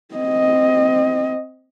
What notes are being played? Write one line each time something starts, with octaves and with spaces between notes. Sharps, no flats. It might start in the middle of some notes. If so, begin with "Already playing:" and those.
C4 D#5